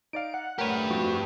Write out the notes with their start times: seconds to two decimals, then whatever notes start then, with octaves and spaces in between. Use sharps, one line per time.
0.13 D#4 D5 F5 D7
0.34 F#5
0.58 A3 G4 A#4 B4 C#5
0.91 F2 F3 F#4